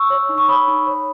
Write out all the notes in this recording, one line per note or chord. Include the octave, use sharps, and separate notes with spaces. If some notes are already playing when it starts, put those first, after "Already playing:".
Already playing: C#6 E6
C#5
D#4
C#6
C#5 B5 D#6
D#4
C#5